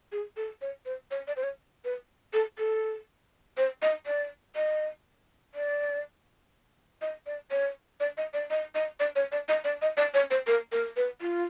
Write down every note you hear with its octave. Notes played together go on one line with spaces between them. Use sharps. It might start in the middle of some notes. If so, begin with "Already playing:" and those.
G#4
A4
C#5
C5
C#5
D5
C5
C#5
B4
A4
A4
C5
D#5
D5
D#5
D5
D#5
D5
C#5
D5
D#5
D5
D#5
D#5
D5
C#5
D5
D#5
D5
D#5
D5
C#5
C5
A#4
A#4
B4
F4